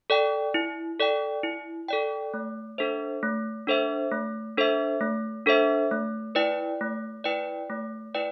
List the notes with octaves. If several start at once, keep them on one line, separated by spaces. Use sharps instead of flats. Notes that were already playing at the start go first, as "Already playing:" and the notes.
A4 D5 G5
E4
A4 D5 G5
E4
A4 D5 G5
A3
D4 A4 C5 E5
A3
D4 A4 C5 E5
A3
D4 A4 C5 E5
A3
D4 A4 C5 E5
A3
E4 B4 D5 G5
A3
E4 B4 D5 G5
A3
E4 B4 D5 G5